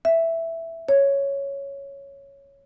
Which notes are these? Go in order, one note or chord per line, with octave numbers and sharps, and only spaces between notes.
E5
C#5